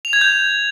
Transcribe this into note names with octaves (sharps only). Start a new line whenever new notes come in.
F7
G#6
G6